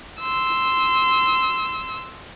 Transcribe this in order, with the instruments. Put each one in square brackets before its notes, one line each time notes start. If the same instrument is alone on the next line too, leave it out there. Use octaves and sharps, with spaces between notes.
[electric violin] C6 E6